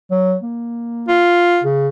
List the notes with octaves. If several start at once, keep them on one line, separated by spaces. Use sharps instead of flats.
F#3
A#3
F4
C#3